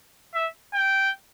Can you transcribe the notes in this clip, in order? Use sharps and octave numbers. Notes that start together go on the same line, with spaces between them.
E5
G5